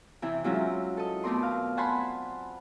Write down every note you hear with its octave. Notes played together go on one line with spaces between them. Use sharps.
C3 E3 E4
F#3 G#3 C4 C#4 E4 F4
A4 D#5
B2 A3 C4 A#4 D5 C6
F5
C5 F#5 G#5 A5 B5 C6